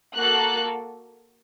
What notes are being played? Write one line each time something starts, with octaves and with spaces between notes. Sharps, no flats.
A#3 F#4 A4 F#6